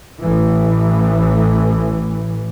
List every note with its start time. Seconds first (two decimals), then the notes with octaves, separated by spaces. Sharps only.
0.23 A1 A2 E3